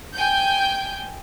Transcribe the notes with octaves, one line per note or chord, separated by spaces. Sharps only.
G5 G#5 G6